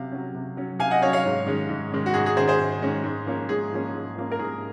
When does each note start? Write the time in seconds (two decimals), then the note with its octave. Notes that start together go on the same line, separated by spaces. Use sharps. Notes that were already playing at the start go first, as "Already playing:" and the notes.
Already playing: C3 F#3 C#4 F5
0.12 F#3 C#4
0.35 C3
0.57 F#3 C#4
0.79 C3 F5 G#5
0.91 D#5 F#5
1.02 F#3 C#4 C#5 F5
1.13 C#5 F5
1.25 G#2
1.46 D#3 G#3 C#4
1.69 G#2
1.92 D#3 G#3 C#4
2.06 F#4
2.14 G#2 G#4
2.26 G#4
2.37 D#3 G#3 C#4 G#4 C5
2.48 G#4 C5
2.59 G#2
2.82 D#3 G#3 C#4
3.04 G#2
3.26 F3 A#3 C#4
3.49 G#2 G#4
3.72 F3 A#3 C#4
3.94 G#2
4.16 F3 A#3 C#4
4.31 A#4
4.39 G#2 G#4